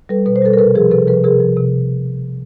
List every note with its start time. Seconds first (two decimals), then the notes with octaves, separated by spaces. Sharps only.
0.09 G3 A4 B4
0.26 B2 B4
0.36 C5
0.42 G3 A4 B4
0.53 A#4
0.59 C3 A4 B4
0.75 F3 G#4 A#4
0.91 C3 A4 B4
1.07 F3 A4 B4
1.24 C3 G#4 A#4
1.40 F3
1.56 C3